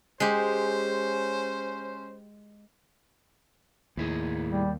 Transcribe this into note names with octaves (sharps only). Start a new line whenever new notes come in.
G#3 C#4 G4 C5
D#2 A2 E4 G#4
G3